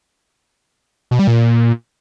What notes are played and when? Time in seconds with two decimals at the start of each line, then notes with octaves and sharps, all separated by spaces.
1.11 B2
1.19 G3
1.28 A#2